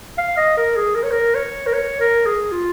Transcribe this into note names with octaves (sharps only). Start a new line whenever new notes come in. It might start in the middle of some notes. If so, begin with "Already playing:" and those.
F5
D#5
A#4
G#4
A#4
C#5
A#4
C#5
A#4
C#5
A#4
G#4
F4